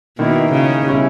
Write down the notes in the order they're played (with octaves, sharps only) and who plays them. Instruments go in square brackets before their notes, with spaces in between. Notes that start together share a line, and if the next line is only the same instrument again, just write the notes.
[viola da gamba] B2 [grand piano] D#3 A#3 E4
[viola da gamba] C#3
[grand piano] B2 G3 C#4 E4